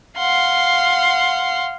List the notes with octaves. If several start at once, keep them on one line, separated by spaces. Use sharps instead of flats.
F5 F#5 C6